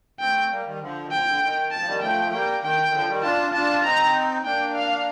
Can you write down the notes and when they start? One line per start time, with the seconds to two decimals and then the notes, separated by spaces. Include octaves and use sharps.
0.20 A3 C4 G5
0.51 G3 A#3
0.66 D#3 G3
0.81 D3 F3
1.03 D#3
1.11 D3 F3 G5
1.26 D3
1.41 D#3
1.72 A5
1.79 F3
1.87 D#3 G3
2.02 F3 A3 G5
2.24 A3
2.32 G3 A#3 G5
2.63 D#3 G5
2.88 D#3
2.92 D3 F3
3.08 D#3 G3
3.23 D4 F4 A5
3.53 D4 F4 A5
3.84 C4 D#4 A#5
4.44 A#3 D4 G5
4.75 F5